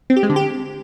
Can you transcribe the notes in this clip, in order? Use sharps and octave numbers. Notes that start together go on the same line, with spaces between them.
C4
G4
G#3
D3
G4